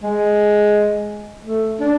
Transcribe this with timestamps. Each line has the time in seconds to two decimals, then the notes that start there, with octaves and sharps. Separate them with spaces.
0.03 G#3
1.45 A3
1.80 D4